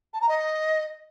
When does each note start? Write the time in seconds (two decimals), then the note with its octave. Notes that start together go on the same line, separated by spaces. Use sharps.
0.13 A5
0.21 A#5
0.28 D#5